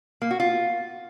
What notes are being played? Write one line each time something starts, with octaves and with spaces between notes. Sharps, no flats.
A#3
F#4
F4